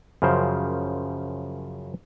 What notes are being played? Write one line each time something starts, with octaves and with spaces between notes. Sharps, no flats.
F#2 C#3 F3 A#4 C5